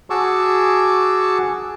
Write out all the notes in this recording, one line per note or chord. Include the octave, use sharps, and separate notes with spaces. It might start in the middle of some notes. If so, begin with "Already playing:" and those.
F#4 G#4 A5 C#6 D6 E6